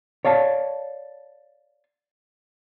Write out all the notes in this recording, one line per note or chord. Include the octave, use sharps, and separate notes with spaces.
C#5 D5 F5 A5